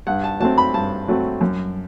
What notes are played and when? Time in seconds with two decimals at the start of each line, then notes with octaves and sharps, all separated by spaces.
0.07 G2 F#5
0.24 A5
0.40 F#3 A3 C4 A5
0.58 B5
0.74 G2 A5
1.08 F#3 A3 C4
1.41 F#2